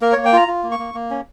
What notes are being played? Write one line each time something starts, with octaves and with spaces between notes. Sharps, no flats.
A#3 A#4
A#3 C#5
G5
F4 A#5
F4
A#3
C#6
A#3
A#3
C#4